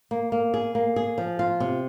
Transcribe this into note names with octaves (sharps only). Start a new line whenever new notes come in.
A#3
A#3
G#4
A#3
G#4
F3
F4
C3